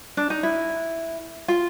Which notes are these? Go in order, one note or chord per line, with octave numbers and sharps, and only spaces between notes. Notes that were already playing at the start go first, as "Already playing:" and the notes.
D4
D#4
E4
F4